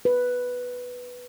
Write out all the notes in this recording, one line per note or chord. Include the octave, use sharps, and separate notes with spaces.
B4